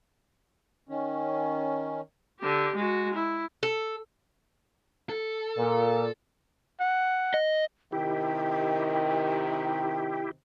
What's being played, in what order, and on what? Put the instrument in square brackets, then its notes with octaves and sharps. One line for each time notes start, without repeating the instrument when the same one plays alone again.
[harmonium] D#3 C#4
[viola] D3 G4
G#3 F#4
E4
[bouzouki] A4
[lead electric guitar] A4
[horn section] A#2
[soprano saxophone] F#5
[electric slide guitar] D#5
[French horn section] C3 D#3 [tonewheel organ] E4 G4 [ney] G5